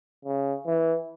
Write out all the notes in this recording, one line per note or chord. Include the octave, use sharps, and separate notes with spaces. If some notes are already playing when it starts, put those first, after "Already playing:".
C#3
E3